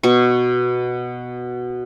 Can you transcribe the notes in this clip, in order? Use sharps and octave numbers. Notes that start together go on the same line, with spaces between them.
B2 C#6